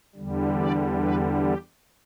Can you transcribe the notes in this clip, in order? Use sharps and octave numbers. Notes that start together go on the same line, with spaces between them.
E2 D3 G3
D5
B4
G4